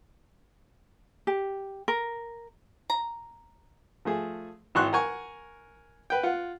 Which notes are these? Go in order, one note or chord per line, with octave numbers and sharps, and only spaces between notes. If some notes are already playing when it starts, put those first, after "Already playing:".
G4
A#4
A#5
F3 A3 G#4
G#1 E3 F#4 C6 C#6 F#6
A#4 F#5 G#5 C#6
B4 G5
F4 F#5